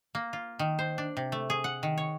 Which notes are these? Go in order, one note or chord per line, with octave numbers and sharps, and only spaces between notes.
A#3
F4
D#3
C5
D4
C3
A3
G#4
F#5
D#3
C#5